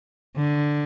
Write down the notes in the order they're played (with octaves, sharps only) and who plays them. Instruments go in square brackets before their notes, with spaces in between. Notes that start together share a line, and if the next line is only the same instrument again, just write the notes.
[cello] D3